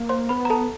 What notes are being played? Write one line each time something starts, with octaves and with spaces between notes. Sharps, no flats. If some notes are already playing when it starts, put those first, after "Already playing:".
Already playing: A#3
C5 C6
B3 B4 B5
A#5
A4 A5